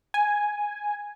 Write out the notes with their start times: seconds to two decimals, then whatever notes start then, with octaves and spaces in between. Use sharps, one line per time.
0.14 G#5